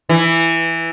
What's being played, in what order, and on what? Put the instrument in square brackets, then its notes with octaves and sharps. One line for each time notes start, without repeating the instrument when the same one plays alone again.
[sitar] E3